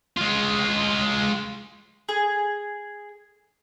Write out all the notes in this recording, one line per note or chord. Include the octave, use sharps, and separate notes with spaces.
G#3 F4
G#4